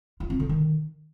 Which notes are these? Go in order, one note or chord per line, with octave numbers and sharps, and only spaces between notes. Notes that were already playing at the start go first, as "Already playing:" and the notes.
F4
C4
D3
D#3